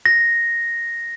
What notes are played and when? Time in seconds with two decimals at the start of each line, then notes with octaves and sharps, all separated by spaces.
0.06 A#6